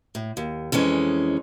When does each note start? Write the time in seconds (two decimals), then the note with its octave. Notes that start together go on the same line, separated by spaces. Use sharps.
0.15 A2
0.37 D#2
0.72 F2 E3 G#3 C#4